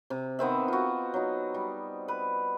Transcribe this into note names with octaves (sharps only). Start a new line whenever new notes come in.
C3
D#3 B3 C4 E5
F4 F#4
F#3 D#4
G3
B4